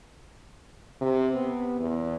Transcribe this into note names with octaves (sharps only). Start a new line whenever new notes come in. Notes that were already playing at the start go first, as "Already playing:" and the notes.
C3
B3
E2